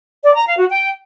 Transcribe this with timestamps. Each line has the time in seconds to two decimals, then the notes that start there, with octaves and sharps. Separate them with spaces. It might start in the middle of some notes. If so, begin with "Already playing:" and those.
0.24 D5
0.35 A#5
0.46 F5
0.58 F#4
0.69 G5